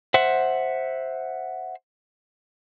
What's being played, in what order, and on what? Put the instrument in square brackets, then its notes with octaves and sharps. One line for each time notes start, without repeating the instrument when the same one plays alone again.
[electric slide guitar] C5 E5 F#5